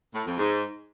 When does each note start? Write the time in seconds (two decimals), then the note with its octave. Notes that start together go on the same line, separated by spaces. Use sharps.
0.14 A2
0.26 F2
0.38 G#2